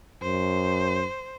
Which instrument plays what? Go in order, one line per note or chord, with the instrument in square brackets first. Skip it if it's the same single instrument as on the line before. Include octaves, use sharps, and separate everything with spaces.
[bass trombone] F#2 [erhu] C5